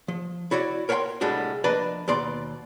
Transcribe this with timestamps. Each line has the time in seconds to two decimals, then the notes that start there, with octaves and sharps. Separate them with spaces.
0.08 F3
0.51 E4 F#4 C#5 D5
0.89 A#4 C#5 E5 F#5 G5 C6
1.21 C2 A2 G3 G#3 D4 F#4
1.64 F3 A#3 D4 B4 D5 D#5
2.08 D#2 B2 D5 C6